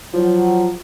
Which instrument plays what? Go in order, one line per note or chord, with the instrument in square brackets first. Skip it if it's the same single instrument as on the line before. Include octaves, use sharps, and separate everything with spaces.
[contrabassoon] F3 [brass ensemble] F#3